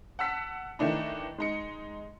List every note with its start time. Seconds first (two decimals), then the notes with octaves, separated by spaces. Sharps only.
0.19 F#5 A5 E6 B6
0.79 D#3 E3 A3 D4 D#4
1.38 G#3 D#4 C#7